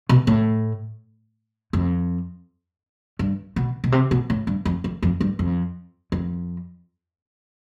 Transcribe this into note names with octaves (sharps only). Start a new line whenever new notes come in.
B2
A2
F2
G2
B2
B2
C3
B2
A2
G2
F2
F2
F2
G2
F2
F2